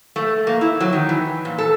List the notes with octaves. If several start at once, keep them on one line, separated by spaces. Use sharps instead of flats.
A3
A#3
E4
F#3
D#3
E3
A#2
A4